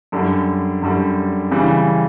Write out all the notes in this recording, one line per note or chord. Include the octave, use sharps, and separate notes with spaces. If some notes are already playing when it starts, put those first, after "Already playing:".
F#2 D3 G3
F#2 D3 G3
C#3 E3 G3